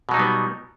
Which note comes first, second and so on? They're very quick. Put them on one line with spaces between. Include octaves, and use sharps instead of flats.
B2 F#3 D#4 G3 B3